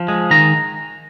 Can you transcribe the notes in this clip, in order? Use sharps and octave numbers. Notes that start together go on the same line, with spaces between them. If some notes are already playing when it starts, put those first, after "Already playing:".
Already playing: F3
G#3
D#3 A#5